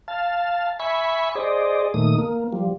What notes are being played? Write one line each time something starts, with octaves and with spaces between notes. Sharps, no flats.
F5 A5
E5 G#5 B5 C#6
G#4 C5 D5 D#5
A#2 D#3 A3 D#6
A#3
F3 G3